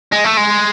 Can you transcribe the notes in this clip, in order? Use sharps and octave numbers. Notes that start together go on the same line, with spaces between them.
G#3
A3
G#3